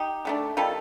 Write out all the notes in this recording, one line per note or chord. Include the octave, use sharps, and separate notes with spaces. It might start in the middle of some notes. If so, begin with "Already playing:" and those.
Already playing: D#4 G4
D3 A3 D4
D#3 G3 C4 F4 A4